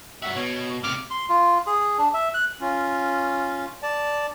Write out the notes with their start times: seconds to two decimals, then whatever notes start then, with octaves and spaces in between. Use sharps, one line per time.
0.22 G2 F#4 E5
0.36 B2 C#5
0.83 A2 C3 D6 F6
1.11 C6
1.29 F4
1.67 G#4
1.98 D4
2.14 E5
2.34 F#6
2.61 C#4 F4
3.83 D5 A5